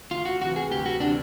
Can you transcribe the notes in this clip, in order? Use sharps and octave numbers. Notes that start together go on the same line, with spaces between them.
D2 F4
F#4
C3 E3 F#4
G#4
D2 G4
F#4
C3 E3 D4